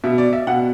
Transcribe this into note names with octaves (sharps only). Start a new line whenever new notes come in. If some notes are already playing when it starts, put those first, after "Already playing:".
B2 E5
D5
E5
B2 F#5